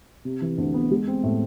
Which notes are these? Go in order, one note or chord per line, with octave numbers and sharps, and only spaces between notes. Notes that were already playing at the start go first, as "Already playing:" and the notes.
C3
E3
D2
B3
G#3
C4
A2